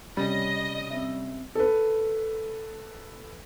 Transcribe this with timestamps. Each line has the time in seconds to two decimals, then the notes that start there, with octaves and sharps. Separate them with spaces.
0.17 C3 G3 C#4 G4 D#5
0.91 C4 E5
1.55 A4 B4